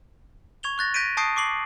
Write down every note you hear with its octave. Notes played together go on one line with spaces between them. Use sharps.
C#6 G#6 F7 G7
C#6 F#6 A6 A#6
G6 A#6 B6 D7 D#7
A5 C#6 D#6 G6 C7 D7
C#6 D6 C7 F#7